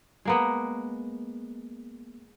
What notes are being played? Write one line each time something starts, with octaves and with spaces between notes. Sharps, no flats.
G#3 A#3 B3